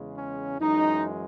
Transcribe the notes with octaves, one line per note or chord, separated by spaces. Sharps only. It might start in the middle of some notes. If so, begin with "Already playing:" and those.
Already playing: E2 C#3 G#3
C#4
F#2 E3 G#3 D#4